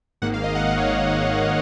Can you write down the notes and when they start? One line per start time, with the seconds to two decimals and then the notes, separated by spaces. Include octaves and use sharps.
0.22 G#1 G#2 D#3 A#3 F#5
0.34 F5
0.44 D#5
0.55 F#5
0.66 F5
0.77 C#5